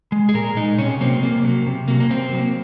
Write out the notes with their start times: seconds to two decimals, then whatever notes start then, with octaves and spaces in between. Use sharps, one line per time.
0.12 G#3
0.29 G#4
0.34 A#2 A#4
0.56 G#3 D#4
0.78 C3 C#4
1.00 F#3 A#3 C4
1.22 C3 A#3
1.44 F#3 A#3
1.67 C3
1.88 F#3 A#3
2.00 A#3
2.10 C3 C4
2.32 F#3 A#3